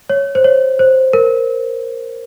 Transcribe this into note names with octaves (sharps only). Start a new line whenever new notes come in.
C#5
C5
C#5
C5
A#4